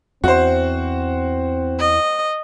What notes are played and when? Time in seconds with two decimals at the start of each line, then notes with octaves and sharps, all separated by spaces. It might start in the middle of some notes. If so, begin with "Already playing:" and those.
0.24 E2 C4 F#4 C5
1.79 D#5